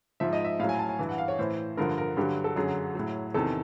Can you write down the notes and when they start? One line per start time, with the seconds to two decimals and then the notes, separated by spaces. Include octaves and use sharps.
0.20 G#2 F3 E5
0.33 D#5
0.45 E5
0.59 A2 F5
0.64 F#3
0.69 G#5
0.79 A5
0.89 G#5
0.99 G2 E3
1.09 F#5
1.18 F5
1.28 C#5
1.39 A2 E3 C5
1.77 G2 D3 F3 A#4
1.98 A#4
2.17 G2 D3 F#3 G4
2.44 A4
2.56 F#2 D3 F#3 G#4
2.95 A2 F#3
3.34 E2 C3 D#3 A4